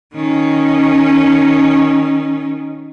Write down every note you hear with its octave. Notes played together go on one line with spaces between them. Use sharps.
D#3 C#4